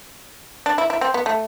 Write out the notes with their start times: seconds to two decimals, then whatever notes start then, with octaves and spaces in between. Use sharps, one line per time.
0.66 D4
0.78 E4
0.90 E4
1.01 C4
1.14 B3
1.26 A3